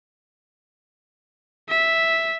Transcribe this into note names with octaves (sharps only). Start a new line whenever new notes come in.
E5